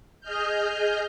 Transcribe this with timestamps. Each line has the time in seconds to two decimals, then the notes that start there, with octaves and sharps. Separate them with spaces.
0.21 G#4 D#5 F6 G6